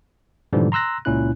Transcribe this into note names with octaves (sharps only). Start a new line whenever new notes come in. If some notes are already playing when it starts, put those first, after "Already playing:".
G#2 B2 D3 E3 F3 G3
A#5 C6 E6 F#6 A#6
C#2 A#2 C#4 E4 F#6